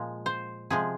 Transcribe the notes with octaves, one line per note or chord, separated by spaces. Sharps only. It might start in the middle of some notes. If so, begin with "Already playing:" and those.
Already playing: A#2 F3 G#3
C5
C3 F3 G#3 G#4